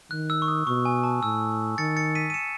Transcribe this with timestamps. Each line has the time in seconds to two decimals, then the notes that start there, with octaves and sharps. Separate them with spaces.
0.11 D#3 F#6
0.30 E6
0.42 C#6
0.48 D#6
0.67 B2 C#6
0.85 G#5
1.03 A5
1.23 A2 E6
1.78 D#3 A6 C#7
1.96 A6 C#7
2.15 B6 D#7
2.30 D#7
2.34 C#7 E7